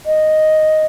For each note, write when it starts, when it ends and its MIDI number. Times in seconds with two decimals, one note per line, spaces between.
0.06 0.86 75